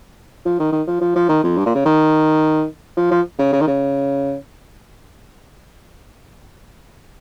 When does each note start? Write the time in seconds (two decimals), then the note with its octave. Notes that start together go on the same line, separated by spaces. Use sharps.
0.46 F3
0.60 D#3
0.72 D#3
0.87 F3
1.01 F3
1.15 F3
1.29 D#3
1.43 F2
1.57 G2
1.66 A#2
1.75 C#3
1.86 D#3
2.97 F3
3.11 F3
3.39 C#3
3.53 C#3
3.61 D#3
3.68 C#3